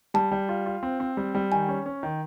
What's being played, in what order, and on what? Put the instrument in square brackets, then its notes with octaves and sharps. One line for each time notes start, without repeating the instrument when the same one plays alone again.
[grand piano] G3 [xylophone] A5
[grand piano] G3
F4
F4
C4
C4
G3
G3
[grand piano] D#3 [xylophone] G#5
[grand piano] C#4
C#4
D#3